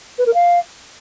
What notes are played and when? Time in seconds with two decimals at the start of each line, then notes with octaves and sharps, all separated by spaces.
0.18 B4
0.26 A#4
0.34 F5